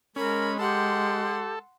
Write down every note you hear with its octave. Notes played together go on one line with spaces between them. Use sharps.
G#3 C#4 A#4 B5
G4 A4 F#5 C6